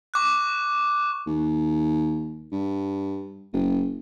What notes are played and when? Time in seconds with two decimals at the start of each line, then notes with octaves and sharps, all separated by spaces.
0.14 C#6 D6 F#6
1.26 D#2
2.52 G2
3.53 F#1